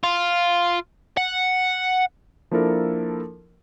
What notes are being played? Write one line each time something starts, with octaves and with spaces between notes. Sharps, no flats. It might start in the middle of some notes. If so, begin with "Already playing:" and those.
F4
F#5
F3 A#3 D4 E4 A4 A#4